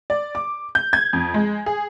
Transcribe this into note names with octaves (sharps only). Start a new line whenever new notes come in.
D5
D6
G6
G#6
F2
G#3
G#4